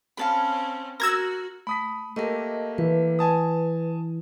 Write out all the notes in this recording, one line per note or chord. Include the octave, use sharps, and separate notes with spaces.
C4 C#4 F5 A5 B5
F#4 A#4 E6 G#6 A#6
A3 B5 D#6 B6
A3 A#3 G4 A#4 D#5
E3 B4
G#5 A5 D#6